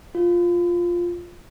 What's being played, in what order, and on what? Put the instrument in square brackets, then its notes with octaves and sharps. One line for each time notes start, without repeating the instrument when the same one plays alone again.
[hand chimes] F4